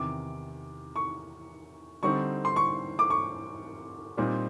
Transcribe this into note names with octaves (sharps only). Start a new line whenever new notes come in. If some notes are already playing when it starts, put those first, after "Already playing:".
Already playing: E2 C3 D#3 D6
C#6
D3 G3 C4 D#4 C#6
C6
C#6
D6
C#6
A#2 G3 C4 D#4